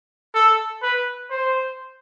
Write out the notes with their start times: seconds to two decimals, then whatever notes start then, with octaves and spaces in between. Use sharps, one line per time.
0.34 A4
0.82 B4
1.30 C5